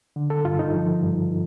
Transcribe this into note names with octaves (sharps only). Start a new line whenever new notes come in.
D3
A4
G2 F4
D#4
F3
G2